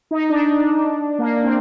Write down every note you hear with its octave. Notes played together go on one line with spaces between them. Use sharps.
D#4
D4
A#3
C4